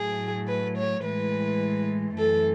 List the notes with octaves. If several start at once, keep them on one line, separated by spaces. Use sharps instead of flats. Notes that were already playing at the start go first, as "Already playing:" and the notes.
Already playing: A2 F#3 A3 G#4
B4
C#5
A2 E3 G#3 B4
F#2 E3 A3 A4